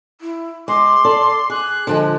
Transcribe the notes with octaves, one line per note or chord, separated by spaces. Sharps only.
E4
G#3 C6 D6
A4 D5
G#4 F#6
D3 F3 G#3